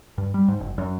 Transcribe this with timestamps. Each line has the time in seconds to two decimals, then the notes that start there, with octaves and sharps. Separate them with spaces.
0.18 G2
0.34 G3
0.48 G#2
0.60 F#1
0.78 F#2